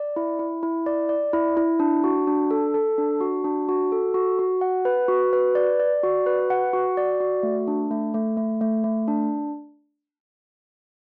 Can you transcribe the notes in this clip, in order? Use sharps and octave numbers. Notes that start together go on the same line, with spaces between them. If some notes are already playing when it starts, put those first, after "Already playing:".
Already playing: D5
E4
E4
E4
D5
D5
E4
E4
D4
F#4
D4
A4
A4
D4
F#4
D4
F#4
A4
F#4
F#4
F#5
B4
F#4
B4
D5
D5
F#4
B4
F#5
F#4
D5
F#4
A3
D4
A3
A3
A3
A3
A3
D4